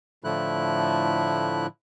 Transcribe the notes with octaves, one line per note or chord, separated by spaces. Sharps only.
A2 D3 F3 A3 E4 F#6